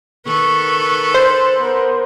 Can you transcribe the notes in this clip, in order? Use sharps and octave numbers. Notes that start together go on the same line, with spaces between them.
D#3 A4 B4 C#6
C5 A5
B3 A#4